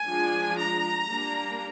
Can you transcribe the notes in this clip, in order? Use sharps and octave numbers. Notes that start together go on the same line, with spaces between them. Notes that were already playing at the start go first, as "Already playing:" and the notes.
Already playing: G#5
F3 G#3 D4
A#5
G3 A#3 D4